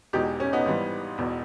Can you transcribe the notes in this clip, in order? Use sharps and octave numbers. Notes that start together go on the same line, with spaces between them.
E1 E2 B2 G#3 D#4 G4
C#4
B3 D#4
G#1 G#2 E3 G3
E1 E2 B2